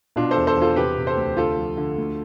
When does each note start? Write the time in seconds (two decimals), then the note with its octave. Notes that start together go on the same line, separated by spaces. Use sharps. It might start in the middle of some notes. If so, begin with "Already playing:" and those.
0.16 B2 D4 F4
0.31 A4 C5
0.37 E2
0.47 A4 C5
0.56 E2
0.62 F4 A4
0.76 C3 G4 B4
0.97 C3
1.07 A4 C5
1.17 D2
1.37 D3 F4 A4
1.58 F3
1.77 D3
1.98 D2